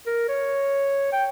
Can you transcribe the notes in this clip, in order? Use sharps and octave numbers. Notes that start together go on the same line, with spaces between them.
A#4
C#5
G5